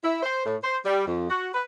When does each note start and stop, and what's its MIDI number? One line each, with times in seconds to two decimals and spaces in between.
0.03 0.20 64
0.23 0.43 72
0.45 0.56 45
0.62 0.76 72
0.85 1.05 55
1.06 1.27 41
1.29 1.49 66
1.53 1.63 71